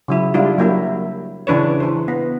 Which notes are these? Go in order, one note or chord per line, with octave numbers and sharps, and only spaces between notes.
C#3 F#3 E4
G3 D4 E4 F4
F#3 A#3 E4
C#3 E3 D4 B4 C#5
E3 C5
B3